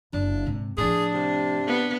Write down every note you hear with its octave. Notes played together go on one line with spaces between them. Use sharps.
F#1 D4
G#2 C3
A2 F3 D4 G#4
C3
B3